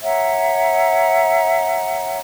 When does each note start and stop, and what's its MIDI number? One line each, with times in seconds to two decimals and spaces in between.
0.04 2.19 73
0.04 2.19 76
0.04 2.19 78
0.04 2.19 82